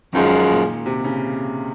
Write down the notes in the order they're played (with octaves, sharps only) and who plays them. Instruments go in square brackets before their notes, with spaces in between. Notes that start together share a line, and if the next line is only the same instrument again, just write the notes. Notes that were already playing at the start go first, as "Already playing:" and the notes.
[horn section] F#2 F3 G#3 [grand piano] D#3
[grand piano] A#2
C3
C#3